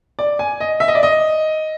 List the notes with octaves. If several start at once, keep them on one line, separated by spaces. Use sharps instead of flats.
D5
G#5
D#5
E5
D#5
D5
D#5